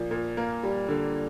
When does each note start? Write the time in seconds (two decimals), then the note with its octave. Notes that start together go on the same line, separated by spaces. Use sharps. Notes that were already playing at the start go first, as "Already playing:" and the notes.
Already playing: A#2 F3
0.11 A#2
0.37 A#3
0.63 G3
0.88 D3